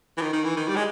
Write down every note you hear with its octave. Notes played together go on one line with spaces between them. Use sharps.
E3
D#3
D#3
E3
D#3
G3
G#3